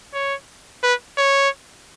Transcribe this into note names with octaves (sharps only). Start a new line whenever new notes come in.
C#5
B4
C#5